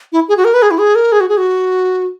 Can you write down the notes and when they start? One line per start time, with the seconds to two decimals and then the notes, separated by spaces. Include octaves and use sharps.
0.12 E4
0.28 G#4
0.37 F#4
0.45 A#4
0.54 B4
0.62 G#4
0.71 E4
0.79 G#4
0.95 A#4
1.12 G#4
1.20 F#4
1.29 G#4
1.37 F#4